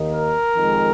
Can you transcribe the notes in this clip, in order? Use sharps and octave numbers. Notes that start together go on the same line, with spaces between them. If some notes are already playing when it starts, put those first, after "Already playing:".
Already playing: D#2 D#3 A#3 D#4
A#4
F2 D#3 G#3